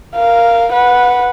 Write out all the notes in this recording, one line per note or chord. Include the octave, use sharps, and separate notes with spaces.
A#4 F5
B4 F#5